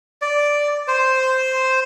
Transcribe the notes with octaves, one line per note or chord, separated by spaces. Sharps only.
D5
C5